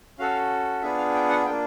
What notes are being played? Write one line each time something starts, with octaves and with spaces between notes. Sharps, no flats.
C#4 F#4 A4 F5
B3 D4 F4 G#4 E5
F5
G5
F#5
A#3 D4 F4 G5